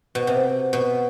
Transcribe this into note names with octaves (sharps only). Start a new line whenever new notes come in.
B2
C3
B2